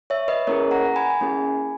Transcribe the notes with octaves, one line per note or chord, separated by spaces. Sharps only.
C#5 E5
B4 D#5
A#3 C#4 E4 G#4 A#4 C#5
F#5 A#5
G#5 B5
A#3 C#4 E4 G#4